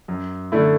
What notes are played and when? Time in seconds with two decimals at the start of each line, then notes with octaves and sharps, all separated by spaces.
0.08 F#2
0.52 D3 A3 E4